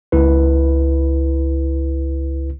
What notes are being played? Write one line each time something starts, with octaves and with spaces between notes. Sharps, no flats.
C#2 E4 B4